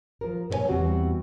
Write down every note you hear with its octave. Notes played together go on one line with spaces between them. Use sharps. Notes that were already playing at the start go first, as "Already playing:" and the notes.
F3 A#4
A#2 F#4 C5 C#5 G#5
E2 G3 C4 F#4 F#5